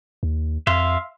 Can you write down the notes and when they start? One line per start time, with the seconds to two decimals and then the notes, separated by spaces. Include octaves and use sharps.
0.23 D#2
0.67 F2 E5 F5 C6